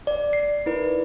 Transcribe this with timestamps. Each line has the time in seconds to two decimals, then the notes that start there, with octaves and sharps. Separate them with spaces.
0.07 D5
0.33 C7
0.66 D#4 E4 A#4 B4 D5